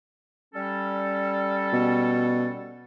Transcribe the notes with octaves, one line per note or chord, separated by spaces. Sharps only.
G3 C#4 A4
B2